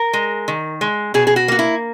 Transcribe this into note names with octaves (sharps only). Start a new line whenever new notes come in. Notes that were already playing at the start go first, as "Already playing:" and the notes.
Already playing: A#4
G#3
D#3
G#3
B2 G#4
G#4
F#4
A#3 F#4
E4